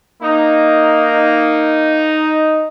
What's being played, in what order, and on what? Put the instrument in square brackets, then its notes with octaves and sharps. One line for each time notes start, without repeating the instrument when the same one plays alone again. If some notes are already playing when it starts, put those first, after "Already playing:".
[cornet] A#3 [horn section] D#4